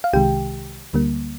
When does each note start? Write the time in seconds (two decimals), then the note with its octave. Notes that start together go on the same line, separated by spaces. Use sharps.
0.04 F5
0.13 C2 C3 D#3 G#3 G4 G5
0.93 D2 D3 G3 A#3